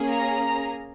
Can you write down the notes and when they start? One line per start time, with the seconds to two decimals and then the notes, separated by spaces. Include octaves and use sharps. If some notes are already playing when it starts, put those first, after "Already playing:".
Already playing: A#3 C#4 G#4
0.09 A#5